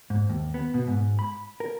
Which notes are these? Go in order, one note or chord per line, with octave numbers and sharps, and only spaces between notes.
G#2
D#2
B3
B2
G#2
B5
A#4